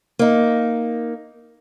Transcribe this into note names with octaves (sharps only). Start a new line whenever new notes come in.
A#3 D#4